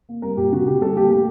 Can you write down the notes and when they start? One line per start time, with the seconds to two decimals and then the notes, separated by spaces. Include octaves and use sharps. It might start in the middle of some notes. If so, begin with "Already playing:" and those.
0.09 A#3
0.22 G3 A#4
0.37 A#2 G4
0.52 D3 F#4
0.66 D3 G4
0.81 G3 A4
0.96 A#3 G4
1.10 A3 G4